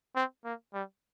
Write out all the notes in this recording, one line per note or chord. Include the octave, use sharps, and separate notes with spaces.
C4
A#3
G3